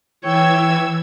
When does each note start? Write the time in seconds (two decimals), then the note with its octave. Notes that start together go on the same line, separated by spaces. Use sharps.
0.23 E3 C#5 G5 E6 G#6